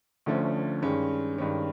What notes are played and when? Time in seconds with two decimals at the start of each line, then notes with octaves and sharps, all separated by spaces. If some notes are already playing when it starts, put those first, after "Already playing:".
0.26 D2 D3 F3 A3 C#4
0.82 G2 D#3 G#3 C#4
1.38 G2 D#3 G#3 C#4